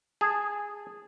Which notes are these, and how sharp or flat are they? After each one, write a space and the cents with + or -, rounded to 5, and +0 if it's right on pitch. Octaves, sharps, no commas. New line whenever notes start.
G#4 -10 A5 +0